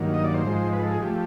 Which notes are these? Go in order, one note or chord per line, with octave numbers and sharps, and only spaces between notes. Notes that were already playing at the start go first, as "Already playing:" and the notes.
Already playing: G2 D#3 F#3 A#3
D#5
D5
C5
G#2 F3 G#3
B4
A4
G#4
F3 A3 G4